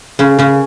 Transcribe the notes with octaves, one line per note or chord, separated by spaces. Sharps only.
C#3 C#4
C#3 C#4